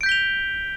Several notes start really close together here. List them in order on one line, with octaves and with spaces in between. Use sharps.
D7 G6 B6 G7 F7